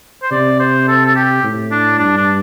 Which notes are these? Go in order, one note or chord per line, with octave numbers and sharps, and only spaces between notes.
C5
C3 D5
C5
A4
A4
G4
A2
D4
G2 D4
D4